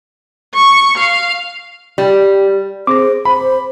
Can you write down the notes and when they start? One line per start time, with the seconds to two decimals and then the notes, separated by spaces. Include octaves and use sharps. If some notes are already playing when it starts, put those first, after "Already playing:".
0.55 C#6
0.97 F5
1.98 G3
2.87 C4 G#4 C5 D6 A#6
3.25 C5 B5